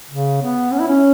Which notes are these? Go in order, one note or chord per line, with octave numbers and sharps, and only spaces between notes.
C#3
B3
C#4
E4
C#4